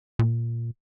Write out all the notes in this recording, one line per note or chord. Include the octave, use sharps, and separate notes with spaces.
A#2